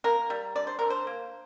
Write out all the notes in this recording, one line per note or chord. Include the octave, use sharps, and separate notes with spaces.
A#3 A#4
G3
D3 D5
C5
D3 A#4
C5
A#3